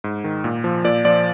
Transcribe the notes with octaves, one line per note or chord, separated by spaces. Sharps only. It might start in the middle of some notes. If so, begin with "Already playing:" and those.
G#2
D#3
A#2
F3
A#2 D5
F3 D5